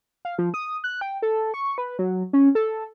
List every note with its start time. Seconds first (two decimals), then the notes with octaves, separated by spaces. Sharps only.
0.25 F5
0.38 F3
0.54 D#6
0.84 F#6
1.01 G5
1.22 A4
1.54 C#6
1.78 B4
1.99 F#3
2.33 C#4
2.55 A4